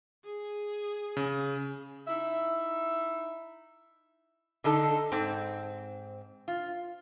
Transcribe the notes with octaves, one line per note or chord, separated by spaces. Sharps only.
G#4
C#3
D#4 E4 E5
D3 D#4 A4
G#2 C4
F4